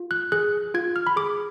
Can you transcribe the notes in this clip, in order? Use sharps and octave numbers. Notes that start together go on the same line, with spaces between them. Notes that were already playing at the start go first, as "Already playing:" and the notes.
Already playing: F4
F#6
G#4 F#6
F4 G#6
F6
B5
G#4 D6